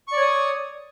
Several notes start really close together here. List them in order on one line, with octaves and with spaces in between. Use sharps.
C#6 D5 C#5 D#6